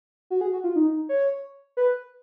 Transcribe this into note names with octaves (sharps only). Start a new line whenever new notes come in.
F#4
G#4
F#4
F4
D#4
C#5
B4